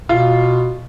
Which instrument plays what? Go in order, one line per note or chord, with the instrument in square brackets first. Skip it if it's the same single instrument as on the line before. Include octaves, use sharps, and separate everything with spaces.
[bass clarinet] B2 [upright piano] F4